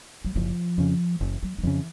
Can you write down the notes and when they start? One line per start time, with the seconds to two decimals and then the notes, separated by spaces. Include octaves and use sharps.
0.25 F#3
0.36 F#1 F3
0.78 F2 C#3
1.21 F#1 E3
1.43 F#3
1.58 D#3
1.63 F2 C#3 E3